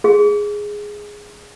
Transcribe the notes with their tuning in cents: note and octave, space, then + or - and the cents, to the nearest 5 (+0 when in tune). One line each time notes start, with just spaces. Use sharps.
G#4 -5